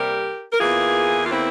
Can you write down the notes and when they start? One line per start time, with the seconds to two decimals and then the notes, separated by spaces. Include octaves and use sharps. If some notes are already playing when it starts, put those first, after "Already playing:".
Already playing: C3 G3 A#3 G4 A#4
0.52 A#4
0.59 E2 E3 A#3 F4 G#4
1.25 F4
1.32 C4 E4